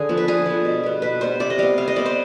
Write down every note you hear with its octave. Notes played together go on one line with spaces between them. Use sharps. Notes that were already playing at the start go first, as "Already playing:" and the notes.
Already playing: D3 G#4
F3 B3
B4
D3 G#4
F3 B3
B2
G3 B3
B2 B4
G3 B3 C5
C3 D5
D#5
G3 B3 F5
C3 F5
D#5
G3 B3 D5
C5